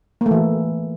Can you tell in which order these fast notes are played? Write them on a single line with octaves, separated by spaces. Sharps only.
A#3 A3 E3